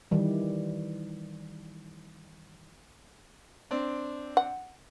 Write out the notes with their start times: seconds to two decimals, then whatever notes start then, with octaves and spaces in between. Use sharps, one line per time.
0.11 D#3 E3 G3
3.71 C4 D4
4.37 F#5